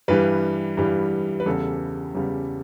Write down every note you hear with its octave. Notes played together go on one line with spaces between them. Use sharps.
G2 E3 G3 B4
G2 E3 G3
B4
E2 C#3 G3 A4
E2 C#3 G3